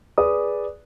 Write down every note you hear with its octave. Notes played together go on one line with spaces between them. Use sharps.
G#4 B4 D5 D#6